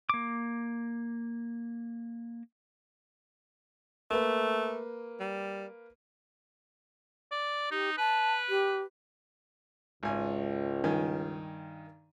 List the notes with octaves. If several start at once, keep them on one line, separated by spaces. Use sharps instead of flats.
A#3 D6
A3 A#3 B4
G3
D5
D#4 G4
B4 A5
G4
G#1 C#2 G#5
G2 D#3 G#5